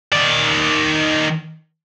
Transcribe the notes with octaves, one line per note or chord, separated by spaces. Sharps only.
D#3 D5